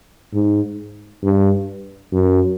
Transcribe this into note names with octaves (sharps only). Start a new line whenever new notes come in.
G#2
G2
F#2